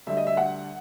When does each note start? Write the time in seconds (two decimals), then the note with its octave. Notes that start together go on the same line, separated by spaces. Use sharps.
0.07 D2 D3 G3 E5
0.17 D#5
0.27 E5
0.37 F#5